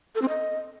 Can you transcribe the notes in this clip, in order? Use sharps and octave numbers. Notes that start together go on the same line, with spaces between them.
A4
C4
D#5